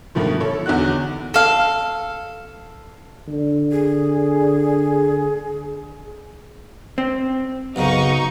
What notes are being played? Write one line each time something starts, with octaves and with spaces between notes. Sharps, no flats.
G2 B2 D#3 F3 A3
A4 C#5
E2 D3 D#4 F#4 F#6
A4 F5
D3
G#4
C4
B1 F#2 C#3 D#4 C#6